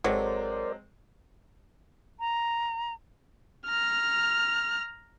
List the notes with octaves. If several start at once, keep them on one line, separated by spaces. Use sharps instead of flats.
G#1 F#3 G#3 C4 A4 A#4 C5 D5
A#5
A#5 F6